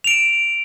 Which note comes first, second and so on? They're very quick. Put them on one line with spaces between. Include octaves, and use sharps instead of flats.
F7 D7 E7